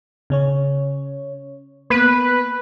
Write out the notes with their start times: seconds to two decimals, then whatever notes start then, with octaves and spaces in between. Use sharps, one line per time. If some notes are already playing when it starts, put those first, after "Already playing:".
0.30 C#3 C#4 C#5
1.90 A#3 B3 B4